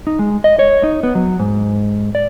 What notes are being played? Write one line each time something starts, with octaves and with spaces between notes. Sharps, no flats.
D#4
G#3
D#5
C#5
D#4
B3
F#3
G#2
D5